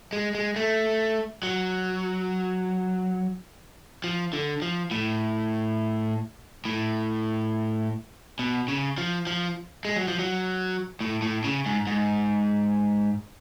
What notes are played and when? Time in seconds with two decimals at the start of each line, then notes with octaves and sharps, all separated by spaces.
0.13 G#3
0.35 G#3
0.56 A3
1.43 F#3
4.04 F3
4.33 D3
4.62 F3
4.91 A2
6.65 A2
8.39 B2
8.68 C#3
8.98 F3
9.27 F3
9.85 G#3
9.96 F#3
10.08 F3
10.19 F#3
11.01 A2
11.22 A2
11.44 C#3
11.66 G#2
11.87 G#2